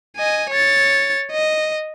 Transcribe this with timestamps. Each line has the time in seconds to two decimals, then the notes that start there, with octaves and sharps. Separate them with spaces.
0.17 D#5 G#5
0.50 C#5 A6
1.32 D#5